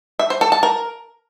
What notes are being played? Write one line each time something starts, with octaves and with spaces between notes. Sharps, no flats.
E5
C5
A4
A5
A#4